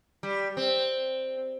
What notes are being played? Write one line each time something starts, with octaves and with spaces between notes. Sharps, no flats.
G3
C4